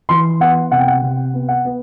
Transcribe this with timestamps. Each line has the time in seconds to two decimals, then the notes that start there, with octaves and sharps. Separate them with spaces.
0.09 E3 C6
0.40 B3 F#5
0.71 C3 F#5
0.79 G5
0.88 F#5
1.02 C3
1.34 B3
1.48 F#5
1.65 B3